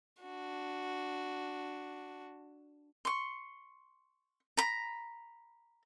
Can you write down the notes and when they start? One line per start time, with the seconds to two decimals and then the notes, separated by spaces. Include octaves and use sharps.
0.21 D4 F#4
3.05 C6 C#6
4.57 A#5 B5